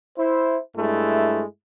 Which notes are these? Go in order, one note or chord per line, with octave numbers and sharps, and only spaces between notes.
E4 C5
G2 G#3 A3 E4